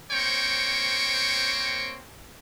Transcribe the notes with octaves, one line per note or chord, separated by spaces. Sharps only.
A#3 C4 C5 C#5 G5 C#6